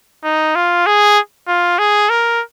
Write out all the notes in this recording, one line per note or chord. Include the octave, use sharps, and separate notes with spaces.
D#4
F4
G#4
F4
G#4
A#4